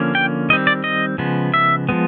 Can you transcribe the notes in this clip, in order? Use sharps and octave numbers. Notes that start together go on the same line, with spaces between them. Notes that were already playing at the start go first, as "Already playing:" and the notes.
Already playing: D3 F3 A#3 C#4
G5
D#3 G3 C4 D#5
D5
D#5
C#3 F3 G#3 B3
E5
F3 G#3 B3